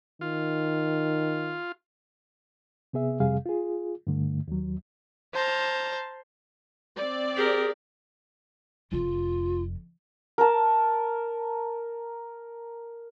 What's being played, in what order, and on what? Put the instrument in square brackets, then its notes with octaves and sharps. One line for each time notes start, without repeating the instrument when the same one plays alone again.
[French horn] D#3 [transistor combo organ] F4
[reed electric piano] C3 B3 G#4 E5
F2 C3 G3 G#4 F5
F4 G#4
G2 D3 A3
D#2 F#3
[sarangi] C5 [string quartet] A5 A#5 F6
[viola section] C4 D5
[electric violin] G4 A#4 [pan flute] G#4
[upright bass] F1 F2 [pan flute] F4
[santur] A#4 A5